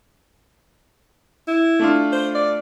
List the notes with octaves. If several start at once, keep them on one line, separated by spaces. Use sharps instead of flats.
E4
A3 D4 F4
C5
D5